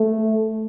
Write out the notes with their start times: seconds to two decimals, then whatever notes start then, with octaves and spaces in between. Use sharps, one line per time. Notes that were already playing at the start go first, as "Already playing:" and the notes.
Already playing: A3